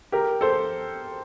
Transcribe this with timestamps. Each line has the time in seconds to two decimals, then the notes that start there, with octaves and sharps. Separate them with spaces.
0.12 G4 A#4
0.41 A4 C5